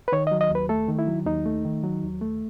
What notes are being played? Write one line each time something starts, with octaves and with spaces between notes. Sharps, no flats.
B4
D#3 C#5
F#3 D#5
D#5
D#2
B4
A3 A4
D#3
E4
F#3
D#2 D#4
A3
D#3
F#3
D#2
A3